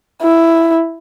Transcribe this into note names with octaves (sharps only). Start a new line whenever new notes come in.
E4